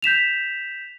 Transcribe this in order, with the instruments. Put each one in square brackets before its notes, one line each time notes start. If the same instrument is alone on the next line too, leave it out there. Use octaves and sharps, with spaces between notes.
[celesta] G6 B6 E7 F7